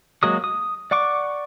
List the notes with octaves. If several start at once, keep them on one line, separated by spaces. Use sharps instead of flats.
F#3 G#3 A#3 F#4 D#6
D#6
D5 F#5 C#6 D6